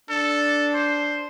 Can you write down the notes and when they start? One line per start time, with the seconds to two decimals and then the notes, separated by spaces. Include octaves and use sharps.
0.10 D4 A4
0.74 C5